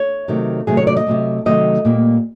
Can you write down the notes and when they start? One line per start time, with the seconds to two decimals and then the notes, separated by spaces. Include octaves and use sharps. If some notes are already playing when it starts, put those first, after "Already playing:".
Already playing: C#5
0.28 C3 D#3 F#3 A3
0.67 C3 D#3 F#3 A3 G#4
0.77 C#5
0.87 D5
0.97 D#5
1.07 C3 D#3 F#3 A3
1.46 C3 D#3 F#3 A3 D#5
1.85 A#2 G3 A#3